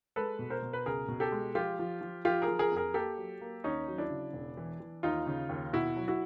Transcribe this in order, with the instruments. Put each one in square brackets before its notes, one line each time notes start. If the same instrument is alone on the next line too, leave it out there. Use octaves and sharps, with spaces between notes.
[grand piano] G#3 A4 B4
B2
A#4 C5
B2
B4
C#2 G#4 A#4
B2
G4 A4
G#3
F3 F4 G4
F3
F3
F3 F4 G4
G#4 A#4
F3
G#4 A#4
F2
G#4 A#4
A#3 G4 A4
F#3
A#3
D#2 C#4 D#4
F#3
D4 E4
C#3
E1
E3
E3
D#2 D#4 F4
C#3
D#2
B2 E4 F#4
F#3
E4 F#4